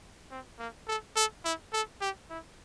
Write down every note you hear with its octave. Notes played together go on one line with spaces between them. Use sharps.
C4
A#3
A4
A4
E4
A4
G4
E4